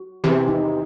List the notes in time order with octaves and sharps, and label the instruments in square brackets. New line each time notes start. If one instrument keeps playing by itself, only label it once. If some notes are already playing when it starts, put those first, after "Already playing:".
Already playing: [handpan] F#4
[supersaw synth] E2 C3 E3 [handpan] G4
[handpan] D#4